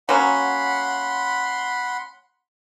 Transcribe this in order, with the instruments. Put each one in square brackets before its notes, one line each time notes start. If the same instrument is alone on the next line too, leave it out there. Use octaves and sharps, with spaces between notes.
[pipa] F#3 A#3 C#4 [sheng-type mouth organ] F#5 B5 C6